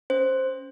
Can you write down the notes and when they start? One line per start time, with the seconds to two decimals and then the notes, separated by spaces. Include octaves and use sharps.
0.10 C#4 C5